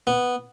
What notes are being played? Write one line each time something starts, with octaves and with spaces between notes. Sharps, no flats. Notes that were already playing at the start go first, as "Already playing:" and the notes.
B3